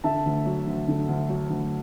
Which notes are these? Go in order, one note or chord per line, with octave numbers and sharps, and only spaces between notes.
D3 E5 A5
D2
F#3
D2
D3
D2
F#3
D2